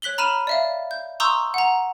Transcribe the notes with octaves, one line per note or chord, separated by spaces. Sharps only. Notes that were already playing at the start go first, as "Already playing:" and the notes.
C#5 F#6 B6 F#7 G7
A#5 B5 F6 D#7 E7
D5 E5 F5
G6
A#5 C6 C#6 D#6 E6 G6
F#5 A#5